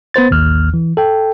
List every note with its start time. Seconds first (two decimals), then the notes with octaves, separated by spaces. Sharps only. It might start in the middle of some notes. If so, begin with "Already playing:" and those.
0.14 B3 B4 C5 A6
0.31 A1 D#2 F6
0.74 E3
0.97 A4 G5